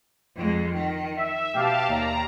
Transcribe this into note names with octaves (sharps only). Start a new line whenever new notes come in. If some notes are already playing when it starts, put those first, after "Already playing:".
F2 G#3
D#3
E5
B2 G4 F5 A5
D#2 D5 A#5